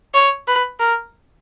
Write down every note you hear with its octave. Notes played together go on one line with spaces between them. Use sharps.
C#5
B4
A#4